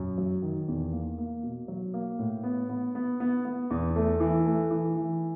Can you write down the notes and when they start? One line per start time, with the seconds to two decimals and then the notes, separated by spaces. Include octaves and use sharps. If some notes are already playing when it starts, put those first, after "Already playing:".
Already playing: F#2
0.18 F#3
0.42 D#3
0.68 E2
0.92 A#3
1.18 A#3
1.43 B2
1.68 F#3
1.94 A#3
2.19 A2
2.43 B3
2.69 B3
2.95 B3
3.20 B3
3.45 B3
3.70 E2
3.96 A3
4.20 E3
4.46 A3
4.70 E3
4.96 E3